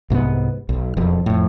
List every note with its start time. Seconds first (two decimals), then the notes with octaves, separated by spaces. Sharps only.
0.10 C2 G#2 F3 B3
0.69 B1
0.97 E1 F2
1.26 F2 A2